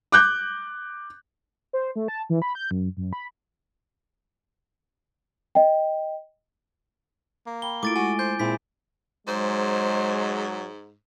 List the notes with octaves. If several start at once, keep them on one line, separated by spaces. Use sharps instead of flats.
D6 F#6 G6
C5
A3
A5
E3
B5
G6
F#2
F#2
B5
D#5 G5
A#3
G5 B5 G7
A3 E4 F4 D6 A6 D7
G#3 F#4 G#5
C5 G6
A#2 C4 E4 G#4 B6
G#2 F#3 G#3 C5